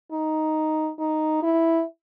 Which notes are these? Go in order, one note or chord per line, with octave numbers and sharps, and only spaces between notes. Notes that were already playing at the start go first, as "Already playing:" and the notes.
D#4
D#4
E4